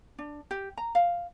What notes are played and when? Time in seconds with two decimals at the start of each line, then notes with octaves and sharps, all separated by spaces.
0.18 D4
0.51 G4
0.77 A#5
0.95 F5